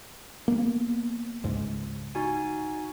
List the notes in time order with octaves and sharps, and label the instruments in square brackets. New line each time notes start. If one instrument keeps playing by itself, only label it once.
[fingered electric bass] A#3 B3
C#2 G#2
[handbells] D#4 F#4 G#5